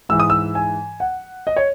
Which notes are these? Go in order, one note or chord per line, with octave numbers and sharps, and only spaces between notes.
G#2 E3 E6
D#6
E6
G#5
F#5
D#5
C#5